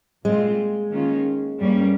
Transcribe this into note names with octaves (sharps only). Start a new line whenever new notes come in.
A#2 G3 G#3 C4 F4
D#3 A#3 C#4 F4
G2 G3 A#3 C#4